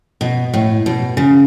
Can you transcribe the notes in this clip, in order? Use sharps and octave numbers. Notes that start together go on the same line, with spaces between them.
B2
A2
B2
C#3